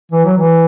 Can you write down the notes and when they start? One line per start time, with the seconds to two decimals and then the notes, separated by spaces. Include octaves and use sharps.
0.11 E3
0.25 F#3
0.37 E3